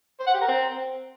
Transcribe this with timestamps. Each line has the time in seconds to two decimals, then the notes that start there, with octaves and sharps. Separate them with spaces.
0.20 C5
0.27 F#5
0.34 G4
0.41 A#4
0.48 C4